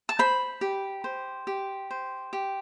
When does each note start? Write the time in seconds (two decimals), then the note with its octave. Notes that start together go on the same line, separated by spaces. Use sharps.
0.09 A5
0.19 C5 B5
0.61 G4
1.04 C5
1.47 G4
1.91 C5
2.33 G4